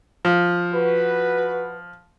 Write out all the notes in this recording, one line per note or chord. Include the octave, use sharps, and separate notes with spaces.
F3
F#4 B4